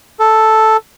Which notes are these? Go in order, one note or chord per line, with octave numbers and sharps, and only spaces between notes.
A4